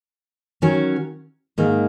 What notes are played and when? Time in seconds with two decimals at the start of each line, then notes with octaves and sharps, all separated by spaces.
0.62 D#3 F#3 C#4
1.58 G#2 D#3 A#3